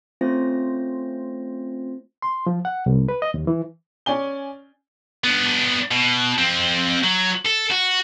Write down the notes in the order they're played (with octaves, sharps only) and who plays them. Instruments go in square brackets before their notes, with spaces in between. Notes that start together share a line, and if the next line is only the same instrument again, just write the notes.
[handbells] A3 C4 C#4 F4 C5 A#6
[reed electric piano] C6
F3
F#5
C2
B4
D#5
D#2
E3
[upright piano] C#4 D5 G#5 G7
[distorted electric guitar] B3 D4
B2
F2 C4
F#3
A4
F#4